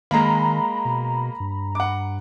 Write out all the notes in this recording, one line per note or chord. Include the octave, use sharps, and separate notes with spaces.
D#3 G#3 A#3 A#5 B5
B2
G2
F#5 D6